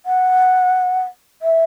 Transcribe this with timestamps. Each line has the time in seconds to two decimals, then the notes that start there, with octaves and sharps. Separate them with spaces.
0.06 F#5
1.42 E5